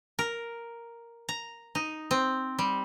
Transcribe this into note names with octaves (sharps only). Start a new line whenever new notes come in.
A#4
A#5
D#4
C4
G3